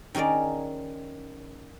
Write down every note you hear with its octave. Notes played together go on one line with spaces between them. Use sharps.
D#3 C#4 G#4 A#4 D5